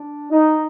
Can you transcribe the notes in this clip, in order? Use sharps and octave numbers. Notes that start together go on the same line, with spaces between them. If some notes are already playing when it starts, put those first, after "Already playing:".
Already playing: D4
D#4